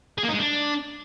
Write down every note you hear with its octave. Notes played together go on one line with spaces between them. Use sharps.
G#4
A#3
D#4
G#3
D4